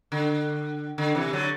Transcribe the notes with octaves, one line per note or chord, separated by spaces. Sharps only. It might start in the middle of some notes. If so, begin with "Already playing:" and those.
D3
D3
C3 E3
D3 F#3